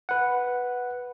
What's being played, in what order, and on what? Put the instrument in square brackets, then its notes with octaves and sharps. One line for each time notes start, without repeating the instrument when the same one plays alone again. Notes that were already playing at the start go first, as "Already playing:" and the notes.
[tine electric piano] B4 F#5